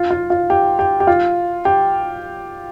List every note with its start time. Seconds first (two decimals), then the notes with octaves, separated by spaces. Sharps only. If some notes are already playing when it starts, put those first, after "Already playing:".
Already playing: F4
0.10 F4
0.30 F4
0.50 G4
0.79 G4
1.00 G4
1.07 F4
1.65 G4